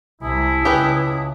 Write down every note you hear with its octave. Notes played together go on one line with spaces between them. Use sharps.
C2 C3 E4 G#5 A5 D#6
C#2 C#3 G4 G#4 B4